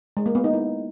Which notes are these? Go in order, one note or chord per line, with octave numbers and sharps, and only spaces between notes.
G#3
A#3
B3
D#4
E4